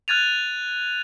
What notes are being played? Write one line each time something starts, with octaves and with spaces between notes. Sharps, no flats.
F6 F#6 G#6 A6 D#7 F7